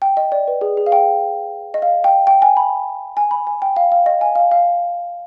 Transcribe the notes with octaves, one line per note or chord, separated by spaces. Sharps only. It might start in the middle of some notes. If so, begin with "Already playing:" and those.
G5
D#5
D5
B4
G#4
G#4
F5
G5
D#5
F5
G5
G5
G#5
B5
G#5
B5
G#5
G5
F5
F5
D#5
G#5
F5
F5